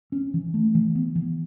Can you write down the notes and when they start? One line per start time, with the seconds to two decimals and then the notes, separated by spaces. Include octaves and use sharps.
0.12 C#4
0.34 E3
0.54 A3
0.75 E3
0.95 B3
1.15 E3